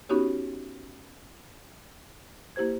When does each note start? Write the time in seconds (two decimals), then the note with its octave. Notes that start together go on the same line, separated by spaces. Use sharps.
0.09 B3 C#4 D#4 F#4 G4 C#5
2.56 A#3 E4 G4 C5 G#6